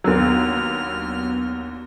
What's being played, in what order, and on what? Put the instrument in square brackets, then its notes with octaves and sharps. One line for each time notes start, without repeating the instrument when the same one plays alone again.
[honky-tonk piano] D#2 F#3 [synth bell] B3 D4 [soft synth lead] F6